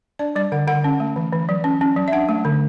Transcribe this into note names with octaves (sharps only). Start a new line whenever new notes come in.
D4 D5
G3 D5
D3 F#5
D3 F#5
C#4
A3
E3
E3
F#3
C#4
C#4
F#3
E5
D4 F#5
A3
D3